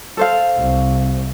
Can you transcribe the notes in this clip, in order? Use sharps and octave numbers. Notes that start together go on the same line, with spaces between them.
A4 C5 F5
C2